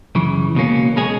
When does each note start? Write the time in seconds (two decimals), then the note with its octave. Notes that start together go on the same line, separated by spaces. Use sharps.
0.15 F#2 C#3 E3
0.55 C#2 B2 A#3 C#4
0.96 B2 G#3 C#4 G#4